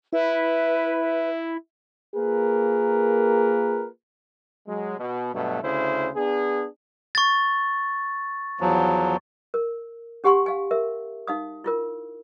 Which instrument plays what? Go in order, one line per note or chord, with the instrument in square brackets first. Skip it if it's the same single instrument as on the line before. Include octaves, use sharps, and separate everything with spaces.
[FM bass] E4 [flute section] B4 [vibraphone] E5
[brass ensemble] A#3 F4 G#4 A#4 B4
[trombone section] F#3 G#3
B2
G2 B2 F#3 A3
D2 C#3 E4 C5
B3 D4 G#4
[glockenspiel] C#6 A6
[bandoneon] E2 F3 F#3
[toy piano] A#4
C#4 G4 F#5 G#5 C6 C#6
F5 G#5
A#4 E5
D#4 F5 D#6
E4 F4 A#4